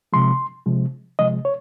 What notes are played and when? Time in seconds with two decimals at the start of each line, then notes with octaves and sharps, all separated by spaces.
0.13 C3 F3 G#3 C6
0.66 C3 F3 G#3
1.19 C3 F3 G#3 D#5
1.45 C#5